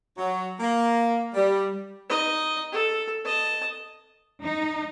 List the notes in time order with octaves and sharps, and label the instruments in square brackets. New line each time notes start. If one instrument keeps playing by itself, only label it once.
[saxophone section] F#3
A#3
G3
[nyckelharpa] D#4 D#5
A4
D#5 A5
[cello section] D#4